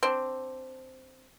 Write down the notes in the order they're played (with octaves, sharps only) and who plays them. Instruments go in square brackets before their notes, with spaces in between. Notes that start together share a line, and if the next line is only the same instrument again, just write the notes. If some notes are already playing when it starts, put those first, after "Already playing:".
[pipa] C4 D4